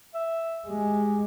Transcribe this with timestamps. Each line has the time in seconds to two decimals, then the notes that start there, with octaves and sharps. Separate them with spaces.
0.14 E5
0.68 G#3 G4